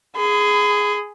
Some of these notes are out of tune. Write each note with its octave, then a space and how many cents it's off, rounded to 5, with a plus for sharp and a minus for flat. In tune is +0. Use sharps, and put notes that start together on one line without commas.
G#4 +0 B5 +40